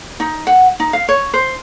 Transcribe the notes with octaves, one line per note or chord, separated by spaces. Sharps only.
D#4
F#5
D#4
F5
C#5
C5